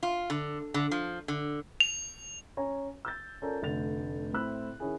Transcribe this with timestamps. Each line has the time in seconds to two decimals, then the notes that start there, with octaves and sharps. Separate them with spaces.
0.03 F4
0.30 D3
0.74 D3
0.91 F3
1.28 D3
1.80 F7
2.57 C#4 C#5 G#5 A#5
3.05 E6 G6 A6
3.42 C#4 F4 A4 A#4 D5 A#5
3.62 F1 D3 A3 A6 F7
4.34 A2 C4 E4 B5 E6 F#6
4.80 D#3 C#4 E4 G#4